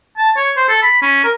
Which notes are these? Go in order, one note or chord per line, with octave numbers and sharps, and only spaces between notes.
A5
C#5
C5
A4
B5
C#4
A#4